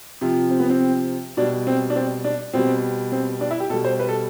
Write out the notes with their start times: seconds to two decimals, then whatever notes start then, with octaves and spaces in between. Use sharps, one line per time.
0.21 C3 F3
0.50 C4
0.60 B3
0.70 C4
1.37 B2 G3 D4
1.67 C4
1.90 D4
1.96 C4
2.24 D4
2.53 B2 G3 C4
3.12 C4
3.41 D4
3.51 E4
3.60 G4
3.70 B2 A4
3.73 G3
3.85 C5
3.99 B4
4.09 A4